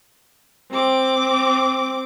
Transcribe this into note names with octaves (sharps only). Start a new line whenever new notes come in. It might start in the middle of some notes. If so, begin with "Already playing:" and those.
C4 D6